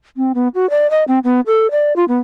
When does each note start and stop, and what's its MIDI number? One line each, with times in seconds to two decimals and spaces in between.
0.17 0.32 60
0.34 0.48 59
0.55 0.69 66
0.70 0.89 74
0.91 1.04 75
1.08 1.19 60
1.24 1.41 59
1.46 1.70 69
1.71 1.95 74
1.96 2.05 65
2.08 2.19 59